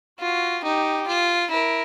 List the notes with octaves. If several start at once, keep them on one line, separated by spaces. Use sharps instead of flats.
F4 F#4
D#4 G4
F4
E4 A#4